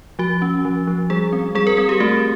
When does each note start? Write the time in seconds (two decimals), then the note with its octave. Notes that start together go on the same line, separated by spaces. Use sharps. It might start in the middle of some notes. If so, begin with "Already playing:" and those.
0.19 F3 F#4
0.42 C#4
0.65 F3
0.87 F3
1.10 G3 G#4
1.33 C4
1.55 G3 G#4
1.67 A#4
1.77 C4 G#4
1.89 G4
2.00 A3 F#4